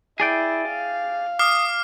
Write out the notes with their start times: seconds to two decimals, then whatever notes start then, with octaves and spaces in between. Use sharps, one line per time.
0.20 E4 G#4 D5 G5
0.70 F5
1.39 D6 D#6 F6 C7